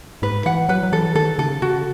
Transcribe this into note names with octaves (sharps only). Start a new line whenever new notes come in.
G#2 B4
E3 F#5
F#3 B4
F#3
E3 A4
D#3 A4
C#3 A4
C#3 F#4